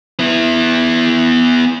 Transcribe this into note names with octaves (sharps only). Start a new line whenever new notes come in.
B3 E4